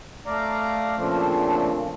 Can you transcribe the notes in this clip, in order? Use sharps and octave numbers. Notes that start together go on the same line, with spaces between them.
A3 D5 F5 A#5
A#2 C#3 F3 A3 C4 D4